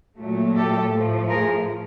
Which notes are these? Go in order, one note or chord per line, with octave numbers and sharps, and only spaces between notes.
A#2 F#3 A3
G4 A4
A2 F3 A3
G#4 A#4